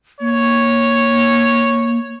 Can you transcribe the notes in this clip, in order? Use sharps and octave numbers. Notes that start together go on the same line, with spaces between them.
A#3 C#5